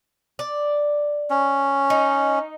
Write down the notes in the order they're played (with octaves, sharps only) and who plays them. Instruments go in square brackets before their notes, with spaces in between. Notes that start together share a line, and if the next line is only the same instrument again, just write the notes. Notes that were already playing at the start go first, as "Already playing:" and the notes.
[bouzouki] D5
[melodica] C#4
[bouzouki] D#4